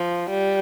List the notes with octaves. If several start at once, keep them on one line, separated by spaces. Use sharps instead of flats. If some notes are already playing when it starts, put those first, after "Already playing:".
Already playing: F3
G3